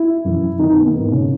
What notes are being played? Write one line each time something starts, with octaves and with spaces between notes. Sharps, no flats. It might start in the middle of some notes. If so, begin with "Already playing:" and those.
Already playing: E4
F#2 E3
D#3 D#4
B3
A#3
G#2 E3 B3
C#3 C#4